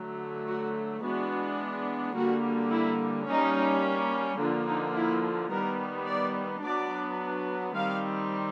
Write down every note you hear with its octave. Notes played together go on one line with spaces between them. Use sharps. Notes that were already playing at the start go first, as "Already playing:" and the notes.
Already playing: D3 F#3 A3
F#4
E3 G#3 B3 D4 F#4
D3 G3 A#3 F#4
E4
G3 A#3 C#4 D#4
D3 F3 A#3 D4
D#4
E4
D#3 G3 B3 A#4
D5
F#3 B3 D4 D5
D#3 G3 C4 F5